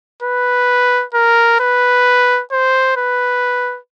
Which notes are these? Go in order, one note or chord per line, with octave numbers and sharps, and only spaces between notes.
B4
A#4
B4
C5
B4